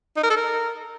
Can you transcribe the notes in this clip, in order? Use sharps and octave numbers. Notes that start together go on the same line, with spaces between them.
D#4
A#4
A4
A#4